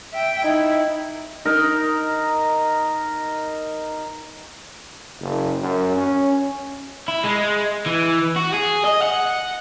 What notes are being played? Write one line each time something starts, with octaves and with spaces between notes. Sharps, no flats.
E5 G5
D#4 E4
D#4 A#4
F#1
F#2
C#4
E4
G#3
E3
F#4
G#4
D#5
F#5